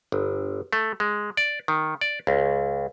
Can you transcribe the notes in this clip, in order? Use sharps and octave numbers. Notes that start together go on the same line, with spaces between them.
G1
A3
G#3
D5
D#3
D5
C#2